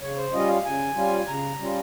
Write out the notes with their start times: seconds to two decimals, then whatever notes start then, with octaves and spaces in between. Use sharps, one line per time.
0.01 C#3 C#5
0.17 C5
0.32 G3 C#4 F4 D#5
0.49 F5
0.65 C#3 G#5
0.96 G3 C#4 F4
1.28 C#3 A#5
1.59 G3 C#4 F4